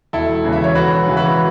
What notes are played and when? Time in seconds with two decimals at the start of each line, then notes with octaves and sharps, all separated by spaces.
0.13 E1 E4 A4
0.44 E2 C#3 E3
0.52 E5
0.64 C#5
0.75 E1 F#4 B4
1.07 E2 C#3 E3
1.17 F#4 B4